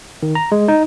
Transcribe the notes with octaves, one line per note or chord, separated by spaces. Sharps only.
D#3
A#5
G#3
D#4